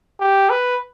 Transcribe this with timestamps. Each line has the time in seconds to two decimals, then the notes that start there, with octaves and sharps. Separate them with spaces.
0.20 G4
0.50 B4